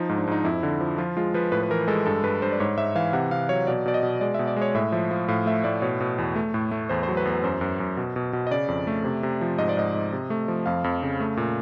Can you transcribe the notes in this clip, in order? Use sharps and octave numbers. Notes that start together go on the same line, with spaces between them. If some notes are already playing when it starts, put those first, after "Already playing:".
Already playing: F3 D#4
G#2
D4
G#2 D#4
F2 E4
D3
F3
F3 F4
G#3 F4
F3 B4
A2 B4
B4
E3 A#4
G#3 A4
G2 A4
G2 B4
G2 C5
D5
G#2 C#5
G#2 E5
E3 F5
C3 F#5
C3 F5
F#3 C#5
B2 D5
B2 D5
D#5
B2
G#3 D5
B2 E5
D5
G#3
C#5
A2 E5
F3 E5
F3 F5
A2 F5
A3 E5
A2 D5
B2 C#5
B2
E2
A3
A2
A3
E2 C5
C5
F#3
B4
E2
B4
F#2 C5
F#2
F#2
B2
B2
B2
D#5
C#3 D5
F2
A3
C3
C3
F3
G#2 D#5
D5
G#2 D#5
G#2
C3
A3
F3
F2 F5
F2
C#3
A3
A#2